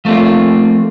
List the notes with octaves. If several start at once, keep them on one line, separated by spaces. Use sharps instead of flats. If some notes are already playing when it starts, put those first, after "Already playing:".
F3 A3 A#3 C4 F4